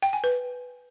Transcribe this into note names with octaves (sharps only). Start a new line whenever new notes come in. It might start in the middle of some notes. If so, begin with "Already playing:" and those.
G5
G#5
B4